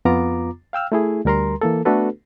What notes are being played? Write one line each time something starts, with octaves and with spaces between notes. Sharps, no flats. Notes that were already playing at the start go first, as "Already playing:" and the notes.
F2 B3 F4 A#5 D6
F5 G5 E6 F6
A3 E4 G#4
D2 G3 A#4 A#5 C6
E3 A#3 A4
A3 B3 D4 F#4 A4 B4